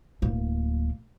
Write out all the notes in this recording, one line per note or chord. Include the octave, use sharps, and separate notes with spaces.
D1 A#3